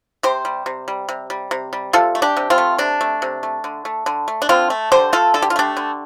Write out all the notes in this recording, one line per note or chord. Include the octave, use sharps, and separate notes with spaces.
C3 G4 C5
G3
C3
G3
C3
G3
C3
G3
C3 F4 A4
A3
D4 G4
C3
C4 F4
A3
C3 D4
A3
C3
A3
D3
A3
D3
A3
D4
D3 C4 F4
A3
D3 G4 C5
A3 F4 A4
D3 A4
G4
F4
A3 D4 G4
D3